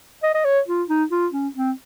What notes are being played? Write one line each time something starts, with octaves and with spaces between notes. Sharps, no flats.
D#5
D#5
C#5
F4
D#4
F4
C#4
C4